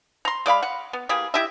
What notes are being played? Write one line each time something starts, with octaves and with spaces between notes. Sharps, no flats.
A#5 C6
G#3 D5 F5 B5
F#5
B3
E3 A#3 G4 G#4
E4 G4 D#5 E5